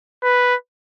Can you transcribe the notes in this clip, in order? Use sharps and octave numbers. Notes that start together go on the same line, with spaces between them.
B4